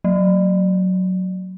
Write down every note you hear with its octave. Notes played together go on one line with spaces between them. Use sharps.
F#3